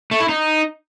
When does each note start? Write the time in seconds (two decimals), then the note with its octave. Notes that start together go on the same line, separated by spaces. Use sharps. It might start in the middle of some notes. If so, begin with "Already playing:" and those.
0.11 A3
0.20 E4
0.29 D#4